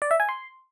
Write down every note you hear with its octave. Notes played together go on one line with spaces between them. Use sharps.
D5
E5
G#5
C6